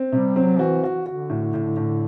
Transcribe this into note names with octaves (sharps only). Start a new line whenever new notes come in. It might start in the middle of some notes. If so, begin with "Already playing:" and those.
Already playing: C4
C3 G3
F#3 C4
E3 F#4
F#4
D3 F#4
A2
A2
A2